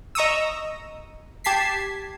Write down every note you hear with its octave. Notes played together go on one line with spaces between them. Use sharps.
D#5 A#5 C#6 D#6 E6
G4 A5 G#6 B6 C7